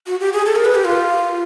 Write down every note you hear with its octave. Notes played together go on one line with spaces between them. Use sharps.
F#4
G4
G#4
A4
A#4
B4
G4
F4